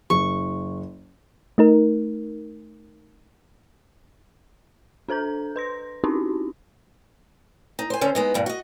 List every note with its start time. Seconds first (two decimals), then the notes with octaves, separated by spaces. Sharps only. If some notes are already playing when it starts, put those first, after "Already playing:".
0.10 F#1 C#6
1.58 A3 D#4 A#4
5.09 D4 A4 C5 A#5 G6
5.56 B4 C6 A#6
6.04 C4 C#4 D#4 E4 F#4 G4
7.79 D#4
7.90 C5 G#5
8.01 D3 C#4 C5
8.15 G#3 B3 D#4
8.34 E2 G2 B2
8.46 F#4 D#5